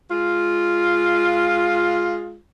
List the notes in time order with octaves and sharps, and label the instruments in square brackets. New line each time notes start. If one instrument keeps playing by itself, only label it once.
[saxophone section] G#3 F4